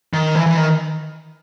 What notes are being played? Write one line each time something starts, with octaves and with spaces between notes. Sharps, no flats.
D#3
E3
E3
D#3